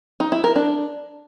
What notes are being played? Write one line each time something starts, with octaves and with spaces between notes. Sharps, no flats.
D#4
E4
A#4
D4